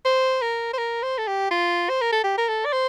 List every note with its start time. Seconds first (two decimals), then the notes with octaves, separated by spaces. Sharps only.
0.05 C5
0.41 A#4
0.74 C5
0.78 A#4
1.03 C5
1.18 A4
1.27 G4
1.51 F4
1.89 C5
2.01 A#4
2.12 A4
2.24 G4
2.38 A#4
2.48 A4
2.66 D5
2.73 C5